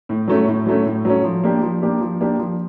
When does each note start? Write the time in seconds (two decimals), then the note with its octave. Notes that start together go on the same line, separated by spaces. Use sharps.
0.09 A2
0.28 F#3 A3 C#4
0.48 A2
0.66 F#3 A3 C#4
0.86 A2
1.05 F#3 A3 C#4
1.24 F3
1.43 A#3 D4 G4
1.62 F3
1.82 A#3 D4 G4
2.01 F3
2.20 A#3 D4 G4
2.39 F3